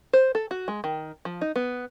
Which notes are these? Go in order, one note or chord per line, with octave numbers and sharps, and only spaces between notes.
C5
A4
F#4
G#3
D#3
F3
D#4
B3